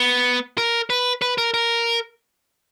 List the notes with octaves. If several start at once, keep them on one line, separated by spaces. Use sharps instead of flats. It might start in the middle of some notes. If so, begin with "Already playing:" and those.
Already playing: B3
A#4
B4
B4
A#4
A#4